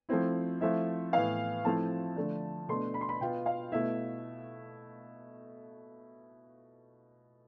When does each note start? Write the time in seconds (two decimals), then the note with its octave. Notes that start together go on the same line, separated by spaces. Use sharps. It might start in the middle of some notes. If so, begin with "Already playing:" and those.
0.09 F3 A3 C4 E4
0.60 F3 A3 C4 E4 E5
1.13 A2 E3 B3 E4 F5
1.65 F3 A3 C4 E4 A5
2.16 D3 F3 A3 D4
2.68 B2 A3 D4 C6
2.94 B5
3.01 C6
3.09 B5
3.21 B2 B3 F4 G5
3.46 F5
3.72 B2 A3 E4 E5